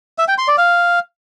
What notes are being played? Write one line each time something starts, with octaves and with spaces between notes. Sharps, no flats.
E5
G5
C6
D5
F5